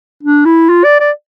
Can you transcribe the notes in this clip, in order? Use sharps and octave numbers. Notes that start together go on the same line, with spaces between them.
D4
E4
F4
D5
D5